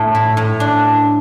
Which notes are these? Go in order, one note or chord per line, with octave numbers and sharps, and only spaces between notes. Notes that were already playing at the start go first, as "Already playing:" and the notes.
Already playing: A2 A3
E4
A2
D4